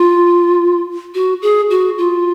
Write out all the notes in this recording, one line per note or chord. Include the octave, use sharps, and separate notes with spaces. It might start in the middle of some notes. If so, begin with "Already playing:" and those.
Already playing: F4
F#4
G#4
F#4
F4